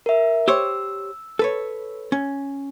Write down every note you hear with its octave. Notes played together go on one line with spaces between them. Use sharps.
A#4 E5
G4 C5 C#5 E6
A4 B4 C#5
C#4